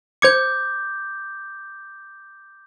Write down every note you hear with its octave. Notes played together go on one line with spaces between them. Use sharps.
C5 D6 G6 G#6 C#7